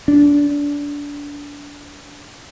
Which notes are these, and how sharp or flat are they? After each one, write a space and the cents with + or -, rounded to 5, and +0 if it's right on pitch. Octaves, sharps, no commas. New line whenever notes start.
D4 -25